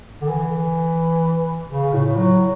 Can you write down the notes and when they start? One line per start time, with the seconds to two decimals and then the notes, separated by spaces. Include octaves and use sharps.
0.22 D3
0.28 E3
1.70 C#3
1.93 A2
2.17 F#3